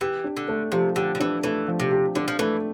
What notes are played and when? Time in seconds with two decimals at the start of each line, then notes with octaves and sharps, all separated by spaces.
0.01 E3 G4
0.24 D4
0.37 D3
0.48 A3
0.72 C3 F3
0.96 D3 G4
1.15 D3
1.20 E3 D4
1.43 E3 A3
1.68 F3
1.80 C3
1.91 G4
2.15 D3 D4
2.28 F3
2.39 E3 A3